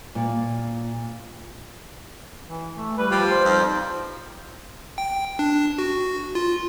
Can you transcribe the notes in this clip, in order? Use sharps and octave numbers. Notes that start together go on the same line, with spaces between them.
A#2
E3
A3
G3 B4
F3 G4
C5
F2 D#4
G5
D4
F#4
F4